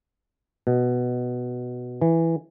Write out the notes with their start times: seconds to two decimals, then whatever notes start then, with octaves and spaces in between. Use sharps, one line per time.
0.67 B2
2.01 E3